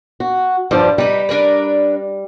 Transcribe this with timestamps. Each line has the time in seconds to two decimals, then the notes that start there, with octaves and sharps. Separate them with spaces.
0.20 F#4
0.71 G2 F3 G3
0.98 G3 D#4 B4
1.29 D4 A#4 B4